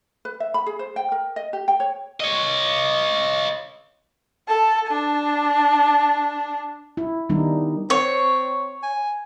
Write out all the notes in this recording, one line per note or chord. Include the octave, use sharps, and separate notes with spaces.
B4
E5
B5
G#4
C5
G5
A#4
D#5
G4
G5
C#5
C#5 D#5
A4 A5
D4 A5
E4
D#3 G3 B3 D4 D#4
C4 C#5
G#5